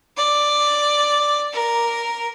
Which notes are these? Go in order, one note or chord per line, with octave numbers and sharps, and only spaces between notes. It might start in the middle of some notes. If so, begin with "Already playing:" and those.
D5
A#4